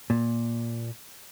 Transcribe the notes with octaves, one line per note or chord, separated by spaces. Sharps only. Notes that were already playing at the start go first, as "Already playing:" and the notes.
A#2